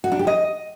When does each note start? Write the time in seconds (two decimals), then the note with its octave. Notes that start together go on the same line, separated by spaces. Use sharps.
0.04 F#4
0.12 D4
0.19 G4
0.27 D#5